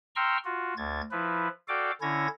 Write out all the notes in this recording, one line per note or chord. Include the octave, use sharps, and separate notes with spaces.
G5 A#5 C6 C#6 E6 F6
F4 F#4
D2 G#6 A6
F3 E4 B4
F#4 A4 D5 F5 G5 D6
D3 C#4 E4 C#5 G#6 A#6